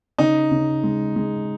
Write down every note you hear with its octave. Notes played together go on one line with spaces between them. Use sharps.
C#3 D#4
C#3
G#3
G#3